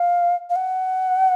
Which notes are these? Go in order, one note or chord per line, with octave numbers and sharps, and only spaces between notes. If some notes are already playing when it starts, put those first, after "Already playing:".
Already playing: F5
F5
F#5